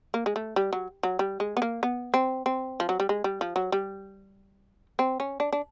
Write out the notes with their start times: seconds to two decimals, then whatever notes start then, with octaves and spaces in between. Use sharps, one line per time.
0.14 A#3
0.26 G#3
0.36 A3
0.56 G3
0.73 F#3
1.03 F#3
1.19 G3
1.40 G#3
1.57 B3
1.62 A#3
1.83 B3
2.14 C4
2.46 C4
2.80 F3
2.89 F#3
3.00 G3
3.09 G#3
3.24 G3
3.41 F3
3.56 F#3
3.72 G3
4.99 C4
5.20 C#4
5.40 D4
5.53 D4